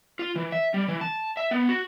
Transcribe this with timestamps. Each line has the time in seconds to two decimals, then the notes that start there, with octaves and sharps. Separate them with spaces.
0.19 F4
0.36 E3
0.52 E5
0.74 G3
0.88 E3
1.01 A5
1.37 E5
1.51 B3
1.69 F#4